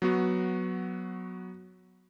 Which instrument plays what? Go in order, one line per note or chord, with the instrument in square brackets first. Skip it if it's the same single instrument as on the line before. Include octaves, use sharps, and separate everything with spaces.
[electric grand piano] F#3 B3 F#4